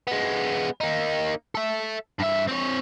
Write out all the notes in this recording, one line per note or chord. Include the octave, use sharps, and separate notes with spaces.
G#3 B3
A#3 D#4
A4 E5
G2 E5
C4 C#5